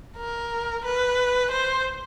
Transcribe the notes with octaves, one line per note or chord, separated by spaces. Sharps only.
A#4
B4
C5